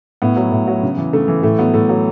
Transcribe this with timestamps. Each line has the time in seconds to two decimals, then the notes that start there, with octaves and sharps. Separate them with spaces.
0.22 A2 B3
0.37 F#3
0.52 A2
0.68 F#3
0.83 C#3
0.97 E3
1.13 C#3 A3
1.28 E3
1.43 A2 A3
1.59 F#3 B3
1.74 A2 A3
1.89 F#3